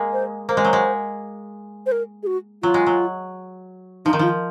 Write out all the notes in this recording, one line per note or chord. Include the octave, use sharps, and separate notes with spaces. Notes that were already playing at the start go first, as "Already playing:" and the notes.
Already playing: G#3 A#3
C5
A#3 C5
G#3
F#3
G#3
C5
A#4
G#4
F#4
F#3 F4
G#3
F#3
F3 D#4
D#3
F3 D#4 F4